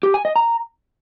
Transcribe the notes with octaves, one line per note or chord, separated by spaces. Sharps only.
G4
G#5
D#5
A#5